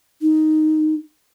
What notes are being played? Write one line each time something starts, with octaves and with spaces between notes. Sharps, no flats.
D#4